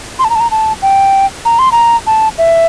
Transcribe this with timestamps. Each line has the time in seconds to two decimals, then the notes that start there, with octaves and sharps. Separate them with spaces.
0.19 C6
0.24 A5
0.30 A#5
0.35 A5
0.40 A#5
0.51 A5
0.82 G5
1.45 A#5
1.59 C6
1.72 A#5
2.07 A5
2.38 E5